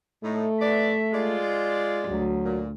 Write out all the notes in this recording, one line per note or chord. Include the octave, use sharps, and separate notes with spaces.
A2 A3 D#4
A2 B3 D5 E5
G#3 F4 D5
D2 F#3
A#2